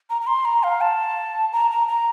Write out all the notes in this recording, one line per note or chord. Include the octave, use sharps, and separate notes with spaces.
A#5
A#5
C6
A#5
F5
A5
A#5
A#5
A#5